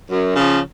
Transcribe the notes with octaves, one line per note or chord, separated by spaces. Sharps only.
F#2
C#3 F3